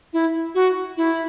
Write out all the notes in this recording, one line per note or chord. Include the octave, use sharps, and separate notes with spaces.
E4
F#4
E4